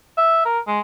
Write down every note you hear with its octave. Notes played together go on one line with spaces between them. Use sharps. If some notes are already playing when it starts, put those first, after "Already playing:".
E5
A#4
G#3